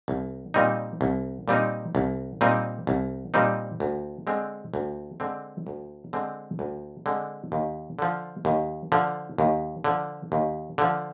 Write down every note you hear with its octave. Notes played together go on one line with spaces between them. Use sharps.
C2
A#2 G3 C4 D#4
C2
A#2 G3 C4 D#4
C2
A#2 G3 C4 D#4
C2
A#2 G3 C4 D#4
D2
D3 G#3 C4
D2
D3 G#3 C4
D2
D3 G#3 C4
D2
D3 G#3 C4
D#2
D3 F3
D#2
D3 F3
D#2
D3 F3
D#2
D3 F3